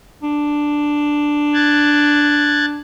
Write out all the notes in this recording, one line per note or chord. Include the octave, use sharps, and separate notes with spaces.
D4
F#6 G#6 A6